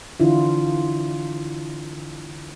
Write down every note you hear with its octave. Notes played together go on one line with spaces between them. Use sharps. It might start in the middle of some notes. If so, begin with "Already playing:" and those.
D3 E3 D4 E4 F4